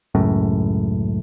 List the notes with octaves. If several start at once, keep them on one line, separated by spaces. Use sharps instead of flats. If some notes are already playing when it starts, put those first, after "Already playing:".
C#2 F#2 A2